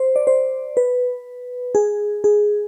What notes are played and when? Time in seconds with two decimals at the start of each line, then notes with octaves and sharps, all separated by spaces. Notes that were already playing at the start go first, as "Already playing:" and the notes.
Already playing: C5
0.16 D5
0.27 C5
0.77 B4
1.75 G#4
2.24 G#4